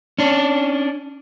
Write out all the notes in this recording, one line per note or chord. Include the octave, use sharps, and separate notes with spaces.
C#4 D4